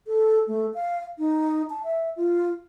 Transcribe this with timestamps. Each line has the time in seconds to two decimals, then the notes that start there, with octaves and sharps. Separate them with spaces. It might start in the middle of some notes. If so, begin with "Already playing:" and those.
0.07 A4
0.47 A3
0.74 F5
1.19 D#4
1.70 A5
1.83 E5
2.17 F4